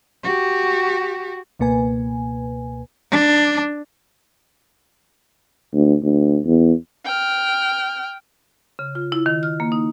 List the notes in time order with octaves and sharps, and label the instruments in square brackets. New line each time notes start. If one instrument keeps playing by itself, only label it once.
[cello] F#4 G4
[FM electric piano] C#2 B2 A#3 B4 G#5
[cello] D4
[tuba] D2
D2
E2
[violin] G5 F6
[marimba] C#3
F4
E4
D#3
F6
A#3
D#4